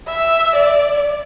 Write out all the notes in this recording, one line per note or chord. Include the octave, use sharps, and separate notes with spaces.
E5
D5